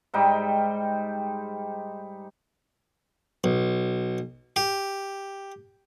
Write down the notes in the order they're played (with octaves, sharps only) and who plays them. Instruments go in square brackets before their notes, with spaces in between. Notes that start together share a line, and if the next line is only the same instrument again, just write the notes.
[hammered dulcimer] G#2 G3 D#4 G5
[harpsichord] B1
G4